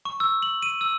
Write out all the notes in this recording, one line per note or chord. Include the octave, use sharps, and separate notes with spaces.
C#6
E6
F#7
D#7
E6